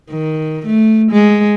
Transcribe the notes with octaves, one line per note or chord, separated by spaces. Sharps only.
D#3
A3
G#3